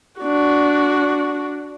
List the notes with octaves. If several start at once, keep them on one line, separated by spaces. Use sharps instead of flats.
D4 F#4